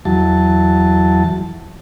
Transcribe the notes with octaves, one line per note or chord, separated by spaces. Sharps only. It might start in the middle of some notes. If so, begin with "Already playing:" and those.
E2 F#3 A5